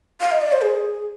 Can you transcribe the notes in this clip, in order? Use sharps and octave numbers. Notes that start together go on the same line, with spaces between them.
F5
D#5
D5
C5
G#4